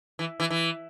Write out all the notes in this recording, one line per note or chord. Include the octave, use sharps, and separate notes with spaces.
E3
E3
E3